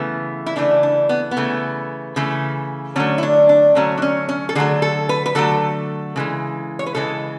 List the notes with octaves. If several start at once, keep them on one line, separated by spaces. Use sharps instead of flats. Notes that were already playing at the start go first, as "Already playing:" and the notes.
Already playing: C#3 E3 A3 B3
E4
C#3 E3 A3 D4
D4
B3
B3
C#3 E3 A3
C#3 E3 A3
D3 F#3 A3 C#4
E4
D4
D4
D3 F#3 A3 C#4
D4
C#4
C#4
A4
D3 F#3 A3 G#4
A4
B4
B4
D3 F#3 A3 A4
C#3 E3 G#3
C#5
B4
C#3 E3 G#3 A4